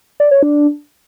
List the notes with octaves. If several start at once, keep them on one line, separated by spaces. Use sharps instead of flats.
D5
C#5
D4